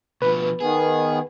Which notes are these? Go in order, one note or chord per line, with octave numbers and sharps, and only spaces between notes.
B2 F3 B4
D#3 B3 G#4